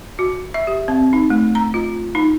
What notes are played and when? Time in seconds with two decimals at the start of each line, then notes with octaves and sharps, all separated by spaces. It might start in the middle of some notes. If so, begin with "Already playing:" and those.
0.19 F#4
0.54 E5
0.67 G4
0.88 C4
1.13 D#4
1.30 A3
1.55 A#5
1.74 F4
2.15 D#4